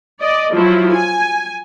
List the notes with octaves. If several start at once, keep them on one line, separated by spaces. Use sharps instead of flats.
D5 D#5
F3 F#3 E4
G#5